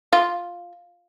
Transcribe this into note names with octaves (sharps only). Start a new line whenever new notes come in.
F4